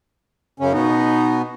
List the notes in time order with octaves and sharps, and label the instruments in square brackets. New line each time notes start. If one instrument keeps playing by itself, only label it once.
[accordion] F#2 C#3 C#4
[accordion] B2 B3 [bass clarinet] D#4